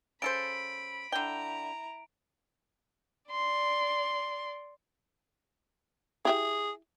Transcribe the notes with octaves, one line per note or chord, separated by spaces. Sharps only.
C#3 A4 C5 B5 D7
D3 E4 G5 A#5
D5 C6
E4 G4 G#4 E5